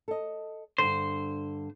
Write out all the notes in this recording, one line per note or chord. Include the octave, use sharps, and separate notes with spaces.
A4 D#5
G2 D3 C5